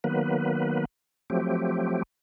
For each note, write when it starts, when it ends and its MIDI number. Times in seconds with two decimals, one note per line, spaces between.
0.04 0.85 51
0.04 0.85 54
0.04 0.85 58
0.04 0.85 59
0.04 0.85 71
1.30 2.03 53
1.30 2.03 54
1.30 2.03 57
1.30 2.03 60
1.30 2.03 67